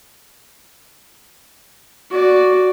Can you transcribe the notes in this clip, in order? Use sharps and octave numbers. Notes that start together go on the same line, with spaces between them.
F#4 D5